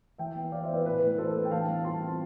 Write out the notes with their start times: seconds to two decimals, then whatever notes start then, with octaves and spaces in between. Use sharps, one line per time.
0.18 E3 E5 G5
0.36 B3
0.52 E3 D5 F5
0.63 C5 E5
0.69 E4
0.74 B4 D5
0.85 A2 B4
1.02 E3
1.18 D4 A4 C5
1.36 B3
1.45 G5
1.51 E3 F5 A5
1.68 G3
1.84 F4 A5 C6
2.01 C4